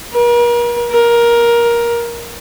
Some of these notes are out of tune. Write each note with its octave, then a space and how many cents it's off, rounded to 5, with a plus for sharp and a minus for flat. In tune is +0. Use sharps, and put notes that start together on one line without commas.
A#4 +40
A#4 +15